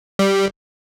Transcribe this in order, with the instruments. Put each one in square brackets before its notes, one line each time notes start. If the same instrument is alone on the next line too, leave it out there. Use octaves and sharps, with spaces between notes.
[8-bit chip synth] G3